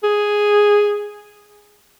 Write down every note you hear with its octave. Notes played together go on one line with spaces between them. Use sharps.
G#4